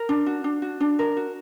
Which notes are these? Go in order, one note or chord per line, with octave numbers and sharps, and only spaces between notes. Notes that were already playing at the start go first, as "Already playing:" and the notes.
Already playing: A#4
D4
F#4
D4
F#4
D4
A#4
F#4